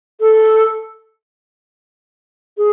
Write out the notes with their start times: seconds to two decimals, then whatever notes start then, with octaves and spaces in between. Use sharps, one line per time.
0.20 A4
2.57 G#4